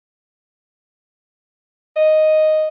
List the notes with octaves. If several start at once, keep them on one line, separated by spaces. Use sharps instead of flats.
D#5